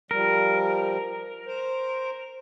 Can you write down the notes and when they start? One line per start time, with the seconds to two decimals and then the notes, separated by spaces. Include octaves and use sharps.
0.11 F3 G3 A#4
1.46 C5